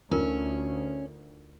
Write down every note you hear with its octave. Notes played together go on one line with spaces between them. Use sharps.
D2 C#4 D#4 F4 A#4